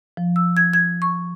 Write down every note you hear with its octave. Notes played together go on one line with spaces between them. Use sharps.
F3
E6
G#6
G#6
C#6